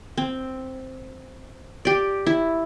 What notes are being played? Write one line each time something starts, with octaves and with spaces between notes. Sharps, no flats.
C4
G4 D5
E4